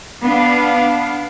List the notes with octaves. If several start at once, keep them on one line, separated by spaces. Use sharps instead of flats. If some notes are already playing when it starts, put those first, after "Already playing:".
B3 D4 F5